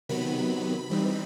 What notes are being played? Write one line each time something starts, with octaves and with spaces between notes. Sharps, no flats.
C3 D#3 F#3 B3 B5
E3 G3 C4 D#4